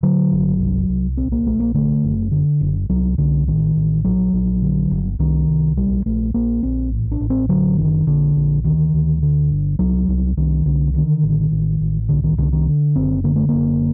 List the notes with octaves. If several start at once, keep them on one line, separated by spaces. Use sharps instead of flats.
D3 F#3
G1
C2
C2
A#1 C4
A#3
A#1 A3
A#3
D3 A3
F#1
D3
F#1
C2 F#3
C2 D3
A1 D#3
A1
A#1 F#3
A#1
D3
G1
C2 D#3
C2
A#1 G3
A#1 A3
A#1 A#3
A#1 C4
A1
D4
A1
C4
D3 F#3
F#1 D#3
A#1 D3
A#1
D2 D#3
D2
D3
G1
C2 F#3
C2
C2 D#3
C2 D3
D3 D#3
A1
A1
A1
C2 D3
D#3
C2 D3
D#3
D3
F#1 C4
D3 A#3
A3
F#1 A#3